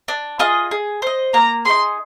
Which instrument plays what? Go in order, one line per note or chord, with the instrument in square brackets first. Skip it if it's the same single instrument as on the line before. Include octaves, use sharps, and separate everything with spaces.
[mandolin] D4
F4 G#4 D#5
G#4
C5 D#5
[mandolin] A#3 [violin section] A#5
[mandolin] D#4 G#4 [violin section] C6